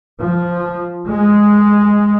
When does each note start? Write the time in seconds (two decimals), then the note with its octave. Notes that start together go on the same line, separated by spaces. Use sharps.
0.20 F3
1.08 G#3